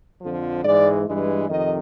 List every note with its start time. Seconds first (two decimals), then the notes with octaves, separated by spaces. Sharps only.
0.20 F2 D3 F3
0.63 G#2 E3 G#3 D5
1.06 G2 E3 G#3
1.48 F2 C3 D#3 D#5